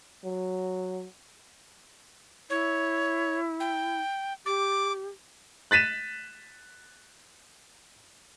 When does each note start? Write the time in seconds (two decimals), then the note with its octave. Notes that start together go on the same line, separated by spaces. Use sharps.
0.25 F#3
2.50 E4 C#5
3.60 G5
4.46 G4 D6
5.71 F#6 A6 B6 D#7 E7